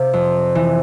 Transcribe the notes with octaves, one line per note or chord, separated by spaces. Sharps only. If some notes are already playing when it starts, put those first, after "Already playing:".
Already playing: C3 F5
F2
E3